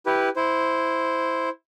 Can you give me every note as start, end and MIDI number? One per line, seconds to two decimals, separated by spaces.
0.06 0.29 64
0.06 0.29 67
0.06 0.29 71
0.36 1.49 64
0.36 1.49 72